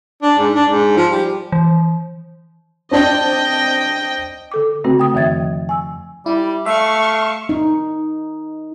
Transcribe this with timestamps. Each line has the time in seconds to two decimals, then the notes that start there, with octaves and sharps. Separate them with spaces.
0.22 D4
0.38 G#2
0.55 D4
0.70 G#2
0.97 F3
1.11 G3
1.52 E3
2.91 C4 D4 D5 D#5 G5
4.52 D3 A4 D6
4.84 C#3 A3 C4 F#4
4.99 G5 D#6
5.14 F2 D#3 F3 E5 G#6 A6
5.69 G#5 E6
6.26 G3 E4
6.66 A3 E5 F5 C#6
7.49 D#4